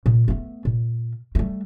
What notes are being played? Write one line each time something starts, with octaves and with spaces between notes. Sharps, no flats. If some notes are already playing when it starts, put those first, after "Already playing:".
A#2
A3 B3
A#2
G3 A3